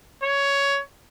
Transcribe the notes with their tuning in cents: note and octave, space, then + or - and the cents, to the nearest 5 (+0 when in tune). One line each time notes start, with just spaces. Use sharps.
C#5 +10